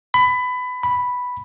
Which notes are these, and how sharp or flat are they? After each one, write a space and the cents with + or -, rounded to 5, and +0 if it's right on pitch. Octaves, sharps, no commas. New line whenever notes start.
B5 +20
B5 +0